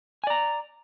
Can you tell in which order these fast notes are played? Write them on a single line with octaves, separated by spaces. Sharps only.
G#5 D5 A#5